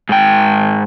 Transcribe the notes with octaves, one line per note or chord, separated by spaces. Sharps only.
G#2 G5